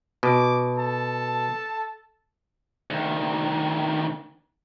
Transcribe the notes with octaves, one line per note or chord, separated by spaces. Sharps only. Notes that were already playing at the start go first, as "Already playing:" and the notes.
B2 D6
A4 A5
D2 D#3